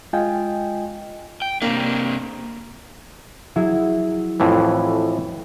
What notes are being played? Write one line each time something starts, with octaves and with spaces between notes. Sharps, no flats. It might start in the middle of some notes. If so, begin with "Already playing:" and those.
G#3 F4 D#5 G5 G#5
G5
C3 A#3 C4 D4
F#3 E4 G#4
F2 A2 E3